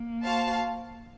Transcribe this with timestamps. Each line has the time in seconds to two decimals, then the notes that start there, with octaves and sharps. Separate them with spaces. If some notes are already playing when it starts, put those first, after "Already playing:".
Already playing: A#3
0.23 F#4 C5 F5 A5